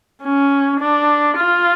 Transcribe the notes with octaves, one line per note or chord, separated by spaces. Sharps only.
C#4
D4
F4